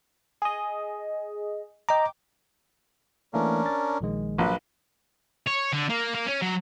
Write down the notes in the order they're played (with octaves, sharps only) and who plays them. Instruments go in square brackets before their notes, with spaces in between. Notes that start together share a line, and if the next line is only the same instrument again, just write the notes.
[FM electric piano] G#4 D#5
[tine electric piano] D#5 A#5 [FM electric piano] G5 D6
[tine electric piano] E3 A3 A#3 [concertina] C#4 D4 A#4
[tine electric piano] A6
A#1 D#3 G#3
[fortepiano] A#1 [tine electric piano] F#3 F4 [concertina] B4
[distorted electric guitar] C#5
D3
A#3
A#3
C#4
F#3